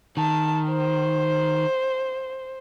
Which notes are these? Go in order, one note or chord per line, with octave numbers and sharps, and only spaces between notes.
D#3 A5
C5